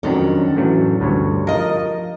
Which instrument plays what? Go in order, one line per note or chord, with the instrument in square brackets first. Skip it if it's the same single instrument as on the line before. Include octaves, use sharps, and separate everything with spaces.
[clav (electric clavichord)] F2 D#3 F#3 [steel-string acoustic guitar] C#4 D4
[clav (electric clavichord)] A2 E3 F#3
D2 G2 C#5
[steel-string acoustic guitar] F3 D#5 [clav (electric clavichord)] A#4 F5 A#5